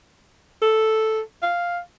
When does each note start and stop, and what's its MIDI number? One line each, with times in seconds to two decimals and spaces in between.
0.62 1.21 69
1.42 1.80 77